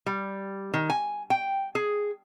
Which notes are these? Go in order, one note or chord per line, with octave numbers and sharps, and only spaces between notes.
G3
D#3
G#5
G5
G#4